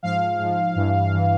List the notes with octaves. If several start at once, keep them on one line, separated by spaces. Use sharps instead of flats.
G#2 F3 F5
G#2 F3
G2 E3
G2 E3